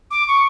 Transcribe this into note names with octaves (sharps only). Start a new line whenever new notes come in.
D6
C#6